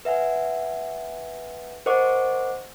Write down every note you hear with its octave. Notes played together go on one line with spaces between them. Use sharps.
B4 E5 F#5 G#5
A#4 C5 D#5 F#5 C#6 D6